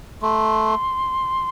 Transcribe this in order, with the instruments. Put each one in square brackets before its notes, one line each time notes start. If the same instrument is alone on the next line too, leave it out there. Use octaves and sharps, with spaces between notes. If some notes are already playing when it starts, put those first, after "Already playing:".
[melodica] A3 [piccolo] C6